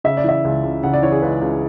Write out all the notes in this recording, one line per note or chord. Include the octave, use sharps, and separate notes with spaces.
C#3 E5
D5
E3 E5
C#2
C#2
C#3 F#5
D5
E3 C#5
G#4
C#2 B4
C#2